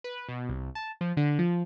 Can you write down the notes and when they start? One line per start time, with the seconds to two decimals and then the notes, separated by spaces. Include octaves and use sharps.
0.04 B4
0.28 B2
0.49 C2
0.75 A5
1.01 F3
1.17 D3
1.39 F3